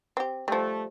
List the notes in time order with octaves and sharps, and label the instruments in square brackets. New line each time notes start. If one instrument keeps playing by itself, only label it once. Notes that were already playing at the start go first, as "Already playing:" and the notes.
[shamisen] C4 G4
[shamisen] F3 G3 [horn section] A3